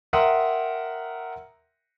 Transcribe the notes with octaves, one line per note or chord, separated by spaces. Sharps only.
A#4 E5 F#5 G5 C6 D#6